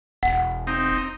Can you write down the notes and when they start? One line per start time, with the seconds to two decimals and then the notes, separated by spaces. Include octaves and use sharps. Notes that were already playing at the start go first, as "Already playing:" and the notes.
0.23 E1 F#5
0.67 C4 D#4